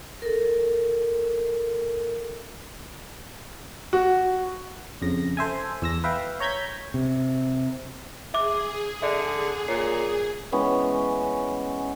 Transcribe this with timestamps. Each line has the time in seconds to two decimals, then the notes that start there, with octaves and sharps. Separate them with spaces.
0.22 A4 A#4
3.93 F#4
5.02 F2 C#3 A#6
5.37 A4 C5 E5 G#5
5.82 E2 E6 A#6
6.04 B4 E5 F5 G5
6.40 C#5 A#5 G6 G#6 B6
6.94 C3
8.34 G#4 E5 D6 F#6
9.02 D3 D5 E5
9.68 A#2 C#5 C7
10.52 E3 G#3 B3 C#4